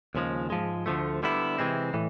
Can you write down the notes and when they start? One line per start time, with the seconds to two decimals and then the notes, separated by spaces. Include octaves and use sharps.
0.15 D#2 C#3 F3 G#3
0.50 G#2 F3 G#3
0.86 D2 D3 F3 A3
1.23 D3 G3 B3 E4
1.58 C3 E3 G#3 C4
1.94 A2 E3